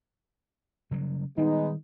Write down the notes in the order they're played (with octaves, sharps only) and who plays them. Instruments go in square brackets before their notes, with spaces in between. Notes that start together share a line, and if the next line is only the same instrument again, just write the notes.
[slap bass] C#3 F#3 G3
[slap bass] D#3 G3 [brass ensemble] G#3 B3 D#4